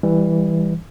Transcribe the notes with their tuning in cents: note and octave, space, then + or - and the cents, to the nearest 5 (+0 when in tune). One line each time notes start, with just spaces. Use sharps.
E3 +0 G3 +15